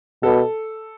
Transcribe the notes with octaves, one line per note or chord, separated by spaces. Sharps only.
B2 A4